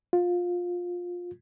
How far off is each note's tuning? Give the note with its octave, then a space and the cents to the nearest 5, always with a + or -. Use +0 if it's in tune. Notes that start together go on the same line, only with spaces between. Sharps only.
F4 +20